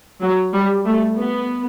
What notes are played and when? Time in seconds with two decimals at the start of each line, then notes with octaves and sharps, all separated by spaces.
0.21 F#3
0.54 G3
0.86 A3
1.18 B3